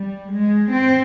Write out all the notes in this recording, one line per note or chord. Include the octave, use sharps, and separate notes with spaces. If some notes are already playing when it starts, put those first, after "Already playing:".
Already playing: G3
G#3
C4